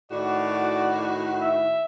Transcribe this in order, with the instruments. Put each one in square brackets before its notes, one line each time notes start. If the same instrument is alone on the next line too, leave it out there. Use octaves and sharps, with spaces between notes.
[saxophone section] A2 D#3 F#4 [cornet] D5
[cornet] E5